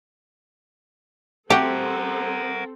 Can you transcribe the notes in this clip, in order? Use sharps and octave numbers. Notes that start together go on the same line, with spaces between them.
A3 C4 F#4 G4 A4 A#4 F#5